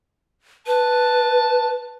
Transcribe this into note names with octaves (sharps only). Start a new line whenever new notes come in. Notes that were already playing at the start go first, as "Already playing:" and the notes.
B4 A5